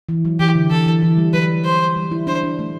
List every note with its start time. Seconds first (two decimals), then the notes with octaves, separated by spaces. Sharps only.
0.09 E3
0.25 F#3
0.39 E3 G4
0.55 D3
0.71 E3 A4
0.86 E3
1.02 E3
1.18 G3
1.33 F#3 B4
1.65 C5
1.96 G3
2.11 E4
2.27 D4 C5
2.43 D4
2.59 A3